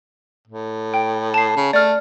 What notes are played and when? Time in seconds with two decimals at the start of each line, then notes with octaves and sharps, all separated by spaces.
0.48 A2
0.94 G5
1.34 A5 C7
1.57 C#3
1.73 A3 D5 F6